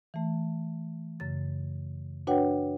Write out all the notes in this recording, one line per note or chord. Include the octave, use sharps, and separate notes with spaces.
E3 A3
F#2 C#3 A6
D4 F#4 B4 C#5 F#5 G5